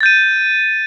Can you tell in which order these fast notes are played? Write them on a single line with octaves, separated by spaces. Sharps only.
A6 G6 D#7